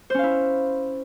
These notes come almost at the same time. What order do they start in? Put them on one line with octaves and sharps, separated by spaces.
C5 C#4 F5 E4